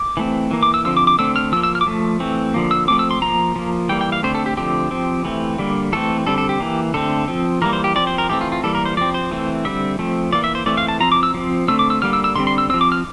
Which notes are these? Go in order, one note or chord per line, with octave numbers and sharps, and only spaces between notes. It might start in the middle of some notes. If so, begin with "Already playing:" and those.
Already playing: D6
E3 A3 C4
E3 A#3
D6
E6
D3 F3 C4 E6
D6
D6
D3 A3 C4 E6
F6
F3 A#3 E6
E6
F6
D6
F3 A3
E3 A3 C4
D3 F3 A#3
E6
F3 A3 C4 D6
E6
C6
F3 A#3 A#5
F3 A#3
E3 G3 A#3 G5
G5
F5
D3 A3 C4 C5
A4
G4
D3 F3 A3 C4 G4
F3 C4
E3 A3 C4
D3 G3 A#3
E3 A3 C4 A4
D3 G3 C4 A4
A4
G4
E3 A#3
D3 A3 C4 A4
F3 C4
E3 G3 A#3 A#4
C5
G4
F3 C4 D5
C5
A#4
E3 A3 C4 G4
F4
F4
E3 G3 A#3 A4
A#4
C5
F3 C4 D5
C5
E3 A3 C4
D3 G3 C4 E5
F3 A3 C4
E3 A#3 D5
E5
C5
E3 A3 C4 D5
F5
A5
F3 C4 A#5
D6
E6
F3 C4
D3 A3 C4 E6
D6
E6
D3 G3 A#3 F6
E6
E6
D3 G3 C4 C6
C6
E6
F3 C4 E6
D6
F6